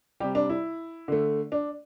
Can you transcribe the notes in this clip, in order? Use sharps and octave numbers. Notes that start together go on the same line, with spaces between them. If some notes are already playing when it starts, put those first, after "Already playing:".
C3 G3 G4
D4
E4
D3 A3
D4